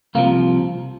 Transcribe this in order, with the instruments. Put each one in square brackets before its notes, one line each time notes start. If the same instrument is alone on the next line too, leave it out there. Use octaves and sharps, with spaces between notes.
[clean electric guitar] C2 C3 F3 A#3